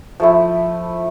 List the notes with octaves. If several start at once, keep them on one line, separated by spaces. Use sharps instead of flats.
F3 A3 E4